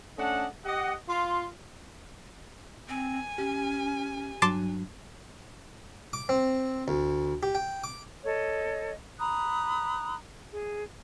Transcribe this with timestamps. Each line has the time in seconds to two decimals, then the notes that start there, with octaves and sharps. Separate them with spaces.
0.18 A3 C#4 D4 D#5 F#5
0.65 G4 D#5 F#5
1.09 F4 C6
2.89 C4 G#5
3.38 C#4 G4
4.42 G2 F#3 D4 A5 C6 D6
6.13 D6
6.29 C4
6.88 D2
7.43 G4
7.55 G5
7.84 D6
8.25 A4 C#5 D#5
9.19 A#5 B5 D#6 F#6
10.51 G#4